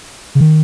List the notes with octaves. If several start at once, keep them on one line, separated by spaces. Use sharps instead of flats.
C#3
D#3